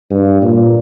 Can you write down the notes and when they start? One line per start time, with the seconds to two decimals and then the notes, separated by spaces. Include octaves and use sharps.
0.10 G2
0.42 A#2